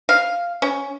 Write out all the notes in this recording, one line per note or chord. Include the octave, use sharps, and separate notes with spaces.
F5
C#4